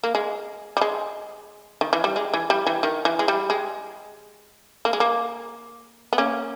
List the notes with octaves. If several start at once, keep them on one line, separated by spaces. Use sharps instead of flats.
A#3
G#3
G3
G#3
D#3
E3
G3
G#3
E3
G3
E3
D#3
E3
G#3
G3
G#3
A#3
G#3
A#3
B3
A#3 C#4